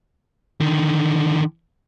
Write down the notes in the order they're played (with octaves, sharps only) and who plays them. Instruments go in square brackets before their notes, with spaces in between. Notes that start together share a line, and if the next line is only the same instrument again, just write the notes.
[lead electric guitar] D3 D#3